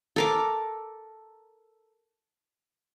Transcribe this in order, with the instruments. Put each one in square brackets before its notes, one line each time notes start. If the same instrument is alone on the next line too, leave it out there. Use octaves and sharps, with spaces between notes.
[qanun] A4 A#4 D6